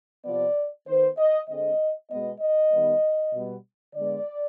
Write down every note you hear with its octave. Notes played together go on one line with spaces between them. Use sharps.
C3 F3 B3 D5
D#3 B3 C5
D#5
D3 G#3 C4 D#5
B2 G#3 B3 D#5
D#5
D#3 G3 B3
B2 G3 B3
D3 G#3 B3 D5